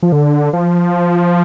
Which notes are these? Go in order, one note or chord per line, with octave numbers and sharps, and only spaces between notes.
F3
D3
F3